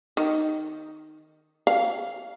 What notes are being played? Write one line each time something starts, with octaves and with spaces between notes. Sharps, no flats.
D#3
F5